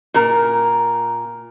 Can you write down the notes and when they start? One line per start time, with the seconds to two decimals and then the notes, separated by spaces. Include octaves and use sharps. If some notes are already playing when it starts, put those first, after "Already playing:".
0.14 A#2 A#4